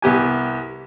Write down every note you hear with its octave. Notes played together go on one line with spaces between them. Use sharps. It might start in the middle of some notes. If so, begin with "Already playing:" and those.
C2 B3 G4 G#5